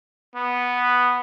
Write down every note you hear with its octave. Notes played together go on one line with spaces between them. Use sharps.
B3